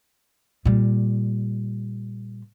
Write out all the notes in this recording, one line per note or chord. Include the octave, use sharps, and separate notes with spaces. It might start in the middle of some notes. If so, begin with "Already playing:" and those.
A#2 G3